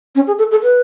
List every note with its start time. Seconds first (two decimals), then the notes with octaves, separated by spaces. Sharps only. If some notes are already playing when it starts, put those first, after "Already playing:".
0.15 C#4
0.27 G#4
0.39 A4
0.51 A4
0.63 B4